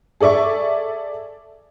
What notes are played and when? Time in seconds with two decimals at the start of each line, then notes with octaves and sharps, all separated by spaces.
0.21 G#4 A4 D5 E5 C#6